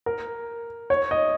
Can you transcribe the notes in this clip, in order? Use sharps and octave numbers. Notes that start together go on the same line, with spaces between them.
A#4
C#5
D#5